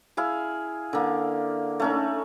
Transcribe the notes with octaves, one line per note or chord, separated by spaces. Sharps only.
E4 G#4 F5
D3 A#3
A3 C#4 D#4